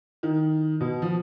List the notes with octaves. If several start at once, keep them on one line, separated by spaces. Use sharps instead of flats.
D#3
B2
F3